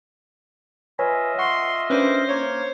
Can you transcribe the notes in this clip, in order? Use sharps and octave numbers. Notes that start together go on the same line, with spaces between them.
F4 B4 C#5 D#5 E5 G#5
F#5 C6 C#6
G3 A#3 C#4 D4 B4 C5
A#3 C#5